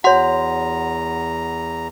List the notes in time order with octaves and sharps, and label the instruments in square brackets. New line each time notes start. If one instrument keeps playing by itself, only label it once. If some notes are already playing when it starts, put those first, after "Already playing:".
[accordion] E2 A#5 [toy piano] F#4 C#5 [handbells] F#5 C6